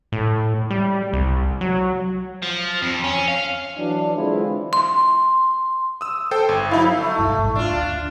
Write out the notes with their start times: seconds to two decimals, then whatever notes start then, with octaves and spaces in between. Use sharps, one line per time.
0.12 A2
0.70 G3
1.13 C2
1.61 F#3
2.42 F3
2.82 F2
3.04 C#4
3.28 F5
3.78 E3 F#3 D4
4.16 D3 E3 G#3 C4 E4 F4
4.73 C6
6.01 D#6 E6
6.31 A4 C5 G5
6.49 G1
6.71 F#3 D#4 E4 F5
6.97 A3
7.18 G2 B2
7.38 A1 G#2
7.56 F3 D4 F4
7.71 G1 D2